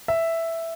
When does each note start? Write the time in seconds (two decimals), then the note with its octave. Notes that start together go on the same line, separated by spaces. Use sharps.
0.08 E5